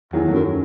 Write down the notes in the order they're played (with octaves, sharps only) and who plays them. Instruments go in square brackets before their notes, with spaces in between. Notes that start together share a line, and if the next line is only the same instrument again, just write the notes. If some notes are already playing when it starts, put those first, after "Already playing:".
[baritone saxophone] E2 [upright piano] D#3 F#3
[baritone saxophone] F#2 [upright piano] F#3 A3